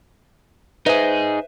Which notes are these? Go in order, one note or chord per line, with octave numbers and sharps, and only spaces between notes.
D#4 G#4 B4 C5 E5